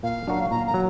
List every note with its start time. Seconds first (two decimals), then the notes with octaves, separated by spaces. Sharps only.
0.03 A#2 F5
0.27 F#3 D4 F#4 A#4
0.51 A#2 A#5
0.67 A#5
0.74 F#3